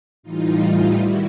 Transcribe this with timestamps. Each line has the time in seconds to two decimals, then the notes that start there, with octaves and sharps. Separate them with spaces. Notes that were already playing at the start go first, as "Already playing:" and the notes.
0.23 A2 E3 G3 D#4 F4
0.95 D#3 G3 E4 F#4